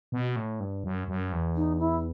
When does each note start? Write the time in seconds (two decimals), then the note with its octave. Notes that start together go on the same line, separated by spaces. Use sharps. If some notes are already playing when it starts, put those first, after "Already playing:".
0.12 B2
0.36 A2
0.60 G2
0.84 F#2
1.08 F#2
1.32 E2
1.56 D#4
1.79 E4